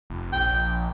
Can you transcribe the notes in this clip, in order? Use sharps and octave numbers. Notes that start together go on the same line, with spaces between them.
F1
A#1 G5